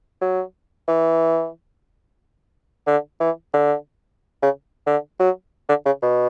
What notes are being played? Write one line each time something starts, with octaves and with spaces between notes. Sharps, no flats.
F#3
E3
D3
E3
D3
C#3
D3
F#3
D3
C#3
B2